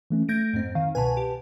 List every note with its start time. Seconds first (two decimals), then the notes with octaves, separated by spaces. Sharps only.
0.11 E3 A3 C#4
0.28 A3 G6 G#6 A#6 D7
0.53 F2 G#2 C4
0.75 D#3 F5
0.95 C2 B2 B4 G#5 A5
1.17 G4